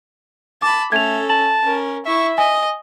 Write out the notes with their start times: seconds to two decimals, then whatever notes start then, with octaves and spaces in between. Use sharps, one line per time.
0.62 A5 B5 D6
0.92 A3 C#4 A4 G#6 F7
1.29 A5 F#7
1.64 C#4 A#4
2.06 E4 E5 C#6
2.38 D#5 G#5